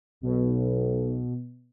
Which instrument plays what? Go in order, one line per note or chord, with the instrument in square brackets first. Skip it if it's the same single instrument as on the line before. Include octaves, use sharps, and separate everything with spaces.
[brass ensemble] B1 [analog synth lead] B2